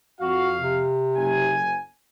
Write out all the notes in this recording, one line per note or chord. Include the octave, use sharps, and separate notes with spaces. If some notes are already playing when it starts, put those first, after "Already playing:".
F2 F#4 F5
C3
F#1 G#5